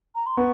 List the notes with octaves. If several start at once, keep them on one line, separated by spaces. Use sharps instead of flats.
A#5
C6
B3 C#6